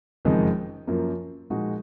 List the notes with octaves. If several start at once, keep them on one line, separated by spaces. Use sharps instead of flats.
F#1 F2 D#3 G#3 D#4
F#2 F3 A#3
A#2 F3 G#3 D#4 F#4